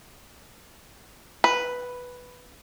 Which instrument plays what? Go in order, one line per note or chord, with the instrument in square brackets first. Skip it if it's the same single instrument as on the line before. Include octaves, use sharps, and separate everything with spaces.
[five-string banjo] B4